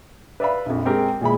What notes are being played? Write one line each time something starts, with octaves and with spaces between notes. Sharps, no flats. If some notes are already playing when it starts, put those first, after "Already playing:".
B4 D5 E5 F5 B5
A#1 F2
G#3 C4 G4 A#4
A#2 E3 G#3 B5